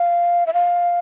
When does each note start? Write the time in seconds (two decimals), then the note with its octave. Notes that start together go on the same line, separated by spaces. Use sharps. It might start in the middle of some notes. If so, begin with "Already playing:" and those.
Already playing: F5
0.47 E5
0.54 F5